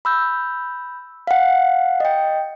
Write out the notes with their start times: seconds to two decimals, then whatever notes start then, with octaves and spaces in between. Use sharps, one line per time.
0.05 B5 E6 G6
1.27 F5 F#5
2.00 D#5 G5